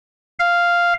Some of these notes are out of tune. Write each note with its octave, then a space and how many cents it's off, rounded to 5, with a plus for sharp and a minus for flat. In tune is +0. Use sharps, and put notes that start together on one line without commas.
F5 -5